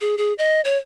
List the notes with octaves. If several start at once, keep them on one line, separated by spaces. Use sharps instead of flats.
G#4
G#4
D#5
C#5